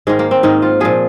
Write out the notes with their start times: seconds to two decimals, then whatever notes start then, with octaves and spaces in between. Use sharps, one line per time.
0.07 G#2 D#3 G#3
0.19 A#3
0.31 C4
0.43 G#2 D#3 D#4
0.62 F4
0.80 A#2 F3 G#4